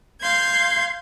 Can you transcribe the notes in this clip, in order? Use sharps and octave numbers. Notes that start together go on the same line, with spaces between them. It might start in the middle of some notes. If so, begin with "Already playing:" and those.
F5 C6 G6 G#6